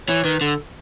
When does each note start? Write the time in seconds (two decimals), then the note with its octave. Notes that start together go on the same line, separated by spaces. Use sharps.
0.08 E3 C#5
0.25 D#3 B4
0.41 D3 A4